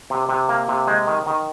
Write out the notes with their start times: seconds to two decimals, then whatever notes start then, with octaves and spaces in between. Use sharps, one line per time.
0.10 C3
0.29 C3
0.49 A#3
0.69 C3
0.87 G#3 C5
1.07 D#3
1.27 D#3